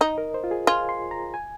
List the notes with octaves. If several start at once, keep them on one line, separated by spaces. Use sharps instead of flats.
D#4 D#5
A#4
C5
F4
G#4
F4 G#5
C6
A#5
G#5